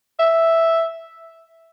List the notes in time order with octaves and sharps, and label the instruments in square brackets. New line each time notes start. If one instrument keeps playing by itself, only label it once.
[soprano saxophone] E5